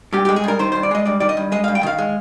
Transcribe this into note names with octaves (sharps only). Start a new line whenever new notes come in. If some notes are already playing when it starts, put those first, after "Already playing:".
G2 G4
G4
G#3
G#4
G2 A#4
D#3 C5
C5
G2
D5
G#3 D#5
G2 D5
D#3 D5
D#5
G2
G#3 D#5
F5
G2
G5
D#3 F5
G#3